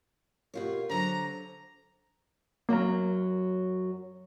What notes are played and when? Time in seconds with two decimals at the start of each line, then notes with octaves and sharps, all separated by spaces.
0.54 B2 F4 G4 A#4 C#5
0.90 D3 F#3 C5 A#5
2.69 F#2 F#3 A#3 A#4